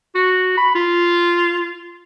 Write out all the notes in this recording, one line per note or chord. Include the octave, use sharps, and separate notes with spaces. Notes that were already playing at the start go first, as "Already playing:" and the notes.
F#4
B5
F4